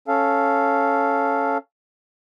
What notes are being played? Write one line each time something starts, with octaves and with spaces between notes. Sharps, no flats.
C#4 A4 F5